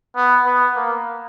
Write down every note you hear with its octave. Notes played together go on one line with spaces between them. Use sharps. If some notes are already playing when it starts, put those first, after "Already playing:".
B3
B3
A#3